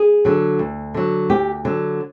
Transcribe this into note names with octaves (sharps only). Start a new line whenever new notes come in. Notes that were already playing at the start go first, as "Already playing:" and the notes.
Already playing: G#4
D3 F#3
D2
D3 F#3
D2 G4
D3 F#3